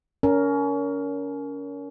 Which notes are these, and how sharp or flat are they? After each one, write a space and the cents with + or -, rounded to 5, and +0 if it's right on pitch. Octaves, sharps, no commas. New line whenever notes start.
C#4 +30 A#4 +0